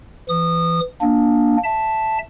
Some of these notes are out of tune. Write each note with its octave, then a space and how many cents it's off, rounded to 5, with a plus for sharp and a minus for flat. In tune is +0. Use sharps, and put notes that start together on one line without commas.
E3 +25 D#6 -25
A#3 +20 D4 +0
E5 +0 A5 +0